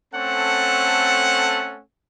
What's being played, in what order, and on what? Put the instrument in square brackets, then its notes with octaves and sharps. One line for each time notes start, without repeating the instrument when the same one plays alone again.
[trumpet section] A3 C4 C#4 A4 F#5